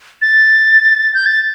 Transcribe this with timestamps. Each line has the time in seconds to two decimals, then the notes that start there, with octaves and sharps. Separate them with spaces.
0.22 A6
1.14 G6
1.26 A6